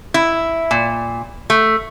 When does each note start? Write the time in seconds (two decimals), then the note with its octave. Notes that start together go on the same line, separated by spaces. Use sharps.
0.14 E4
0.71 A#2
1.50 A3